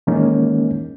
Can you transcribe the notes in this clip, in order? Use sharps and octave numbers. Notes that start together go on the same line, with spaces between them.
D#3 E3 G#3 A#3 C#4 D#4